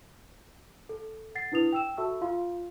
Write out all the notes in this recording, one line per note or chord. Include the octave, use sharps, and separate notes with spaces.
A4
F#5 A6 C7
D4 E4 B4 D#6 F7
G5 E6 E7
F#4 A4 E5 A5 C#6 E6
F4 F5 C6